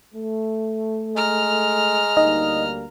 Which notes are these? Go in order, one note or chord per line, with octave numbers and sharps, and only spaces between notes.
A3
G#3 A#5 F6
D2 G3 A#3 D#4 D#5